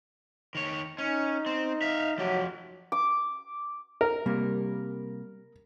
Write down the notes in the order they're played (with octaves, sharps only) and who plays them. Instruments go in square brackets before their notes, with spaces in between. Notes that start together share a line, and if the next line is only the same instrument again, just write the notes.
[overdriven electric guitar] D#3 C#5
[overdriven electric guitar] C#4 [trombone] D#4
[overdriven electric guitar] C4
E5 F5
[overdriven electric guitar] F3 G4 [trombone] F#3
[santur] D6
[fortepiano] A#4
[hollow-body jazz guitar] C3 G3 A#3